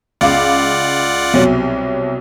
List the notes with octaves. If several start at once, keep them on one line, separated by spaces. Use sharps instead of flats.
C#2 F4 D5 F5 F#5 D6
C2 B2 F#3